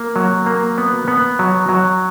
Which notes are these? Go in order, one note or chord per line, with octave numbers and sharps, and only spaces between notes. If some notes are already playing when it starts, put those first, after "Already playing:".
Already playing: A#3
F#3
A#3
B3
B3
F#3
F#3